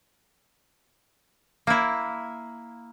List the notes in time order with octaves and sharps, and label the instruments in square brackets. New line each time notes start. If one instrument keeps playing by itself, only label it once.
[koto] A#3 E4